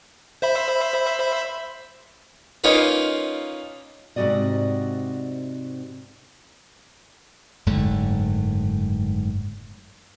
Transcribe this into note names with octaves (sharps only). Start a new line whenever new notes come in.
C5 E5 B5
A#3 C#4 D#4 F4 A#4 B4
G#2 C3 A3 F#4 D5 D#5
F#1 G#2 D3 A3